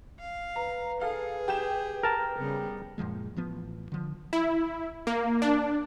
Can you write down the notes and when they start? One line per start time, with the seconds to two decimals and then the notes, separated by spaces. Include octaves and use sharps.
0.20 F5
0.56 B4 A#5
1.01 G#4 A4 F5
1.48 G4 G6 E7
2.03 A#4 A5
2.37 C#3 G3 B3
2.98 F#2 A#2 F3 G#3
3.36 A1 F3 B3
3.92 D3 F3
4.33 E4
5.07 A#3
5.42 D4